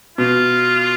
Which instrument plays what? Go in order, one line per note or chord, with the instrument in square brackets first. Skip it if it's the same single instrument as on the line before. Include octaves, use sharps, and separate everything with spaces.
[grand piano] B2 [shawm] F4